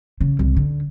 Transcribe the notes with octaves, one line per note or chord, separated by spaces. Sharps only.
C#3
C2
D3